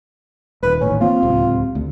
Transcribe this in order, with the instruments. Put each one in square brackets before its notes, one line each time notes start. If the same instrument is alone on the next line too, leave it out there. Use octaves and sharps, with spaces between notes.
[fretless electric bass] D#1 [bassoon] B4
[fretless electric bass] A1 D#2 [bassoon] C#4
[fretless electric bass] A#3 C4 [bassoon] F4
[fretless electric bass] D1 C#2 C3
D2